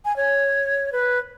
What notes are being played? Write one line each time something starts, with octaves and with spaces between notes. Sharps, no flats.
G#5
C#5
B4